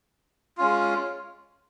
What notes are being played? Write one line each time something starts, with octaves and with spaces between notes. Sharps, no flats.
G#3 C#4 F4